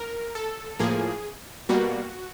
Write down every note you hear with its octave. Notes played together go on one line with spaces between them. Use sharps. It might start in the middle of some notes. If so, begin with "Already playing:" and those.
Already playing: A#4
A4
A2 F3 A#3 G#4
B2 G3 A#3 F#4